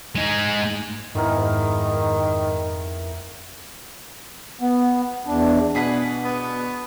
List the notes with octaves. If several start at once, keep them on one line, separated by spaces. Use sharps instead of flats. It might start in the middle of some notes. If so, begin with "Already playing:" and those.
G#3 D#4
F2 G#2 D#3 B3 E4 A#4
B3
E2 D4
B2 D4 G#4 B4 F#5 B6
B3